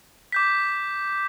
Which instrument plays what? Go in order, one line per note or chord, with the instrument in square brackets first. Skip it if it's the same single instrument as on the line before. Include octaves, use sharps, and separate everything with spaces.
[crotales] D6 G6 B6